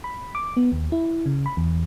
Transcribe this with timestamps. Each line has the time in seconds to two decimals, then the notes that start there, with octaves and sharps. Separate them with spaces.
0.04 B5
0.35 D6
0.57 B3
0.72 D#2
0.92 E4
1.26 C#3
1.46 B5
1.57 E2